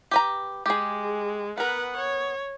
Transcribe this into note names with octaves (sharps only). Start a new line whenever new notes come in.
G4 B4 A#5
G#3 G4 G#4
B3 A#4 B4 F#5
C#5